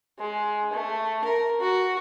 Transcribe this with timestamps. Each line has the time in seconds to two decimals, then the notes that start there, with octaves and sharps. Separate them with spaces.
0.19 G#3
0.73 A3
1.24 A#4
1.60 F#4